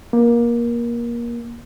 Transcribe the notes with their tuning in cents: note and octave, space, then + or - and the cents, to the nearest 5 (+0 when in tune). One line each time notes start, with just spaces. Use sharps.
A#3 +25